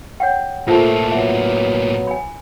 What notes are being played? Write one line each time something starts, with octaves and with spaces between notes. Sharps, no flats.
C#5 F#5 G5
A2 A3 A#3 F4 A4 A#4 C5
F#3 B3 E5
G#5 B5